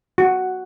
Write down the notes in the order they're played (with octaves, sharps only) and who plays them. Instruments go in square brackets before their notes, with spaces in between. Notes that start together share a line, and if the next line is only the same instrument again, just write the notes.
[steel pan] F#4